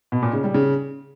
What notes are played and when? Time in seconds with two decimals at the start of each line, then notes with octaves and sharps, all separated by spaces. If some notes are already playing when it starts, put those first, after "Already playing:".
0.12 B2
0.23 A#2
0.33 C#3
0.44 G3
0.54 C#3